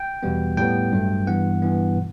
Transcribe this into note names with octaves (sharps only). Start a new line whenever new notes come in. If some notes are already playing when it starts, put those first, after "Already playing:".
Already playing: G5
E2 B2 G3 B3
A2 G3 B3 G5
G2 F#3 A3
G2 E3 B3 F#5
G2 E3 B3
B2